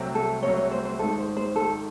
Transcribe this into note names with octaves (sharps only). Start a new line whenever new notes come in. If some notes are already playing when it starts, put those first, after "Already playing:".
Already playing: C2 C3 F#3 A3 C4
A4
C2 C3 F#3 A3 C4 C#5
C#5
C5
C5
G#1 G#2 D#3 A4
C5
C5
G#1 G#2 D#3 A4